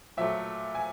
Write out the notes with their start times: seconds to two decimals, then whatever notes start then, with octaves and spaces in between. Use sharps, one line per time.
0.17 A#2 F#3 A3 E5
0.75 G#5